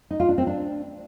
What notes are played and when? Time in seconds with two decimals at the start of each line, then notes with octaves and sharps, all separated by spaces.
0.11 D#4
0.20 F4
0.29 D4
0.38 C4
0.47 D4